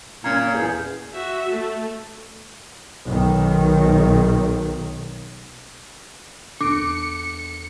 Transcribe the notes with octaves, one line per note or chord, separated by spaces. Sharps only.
A#2 C#4 A#5 G#6
E2 G#4 G6
F#4 E5
A3
B1 D#3
E2 D4 A4 D6 C#7 D7